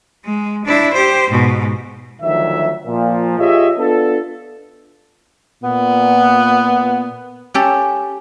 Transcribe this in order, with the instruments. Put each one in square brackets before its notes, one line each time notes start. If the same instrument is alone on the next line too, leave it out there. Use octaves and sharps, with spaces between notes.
[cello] G#3
D4 E4
G4 C5
G#2 B2
[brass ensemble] D2 D#3 F3 F#3 E5
A#2 F3
F4 G4 G#4 C#5 D#5 E5
B3 D4 F4 A4
[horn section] A#2 B3
[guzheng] C#4 G4 A4